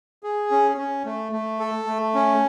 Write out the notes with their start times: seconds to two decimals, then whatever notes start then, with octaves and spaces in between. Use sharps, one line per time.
0.23 G#4
0.51 C#4
0.78 C#4
1.05 A3
1.32 A3
1.59 A4
1.87 A3
2.15 C#4